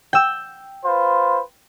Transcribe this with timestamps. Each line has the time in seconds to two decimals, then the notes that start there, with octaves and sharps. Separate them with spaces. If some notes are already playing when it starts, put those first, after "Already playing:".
0.13 G5 E6
0.85 F4 B4 C5